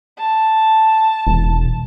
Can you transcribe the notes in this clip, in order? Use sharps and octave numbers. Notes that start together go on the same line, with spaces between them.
A5
E1